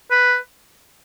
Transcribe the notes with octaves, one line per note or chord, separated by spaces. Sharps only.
B4